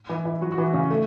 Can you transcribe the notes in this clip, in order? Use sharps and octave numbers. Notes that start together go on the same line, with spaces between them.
E3 E4
E3 E4
F#3 F#4
F#4
E3 E4
C#3 C#4
A3